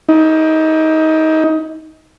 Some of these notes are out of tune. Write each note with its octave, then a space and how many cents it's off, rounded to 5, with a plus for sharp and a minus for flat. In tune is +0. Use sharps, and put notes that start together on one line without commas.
D#4 +25